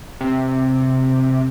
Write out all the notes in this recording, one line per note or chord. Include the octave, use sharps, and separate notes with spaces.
C3